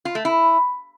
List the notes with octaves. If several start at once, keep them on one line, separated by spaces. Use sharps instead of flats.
F4
A3
E4